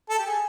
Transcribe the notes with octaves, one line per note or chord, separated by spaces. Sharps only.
A4
G4
G#4